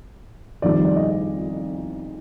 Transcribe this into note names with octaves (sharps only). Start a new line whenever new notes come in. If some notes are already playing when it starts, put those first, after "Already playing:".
F2 D#3 G3 D5
D5
D#5